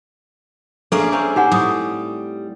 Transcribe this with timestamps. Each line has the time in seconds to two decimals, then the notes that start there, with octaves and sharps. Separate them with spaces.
0.92 A#3 C#4 D4 G#4 A4 E5
1.12 A#3 C4 C#4
1.36 D#4 G4 C5 F#5 G#5
1.52 A2 G3 D6 D#6